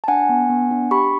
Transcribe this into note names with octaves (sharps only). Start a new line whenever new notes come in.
A5
D4 F#5 G#5
B3
B3
D4
G4 B5 C#6